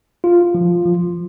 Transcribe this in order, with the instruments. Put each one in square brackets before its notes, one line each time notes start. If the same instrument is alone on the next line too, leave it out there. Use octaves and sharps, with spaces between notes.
[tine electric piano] F4
F3
F3